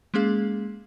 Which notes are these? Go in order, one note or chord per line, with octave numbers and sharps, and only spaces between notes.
G#3 A#3 C#4 G#4 F5